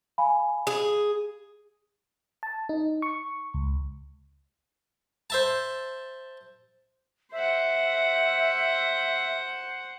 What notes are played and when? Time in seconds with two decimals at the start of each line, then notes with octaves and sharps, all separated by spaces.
0.18 F5 G#5 B5
0.67 G#4
2.43 A5
2.69 D#4
3.02 C#6
3.54 C#2
5.30 C5 E5 A5
7.33 C5 E5 F#5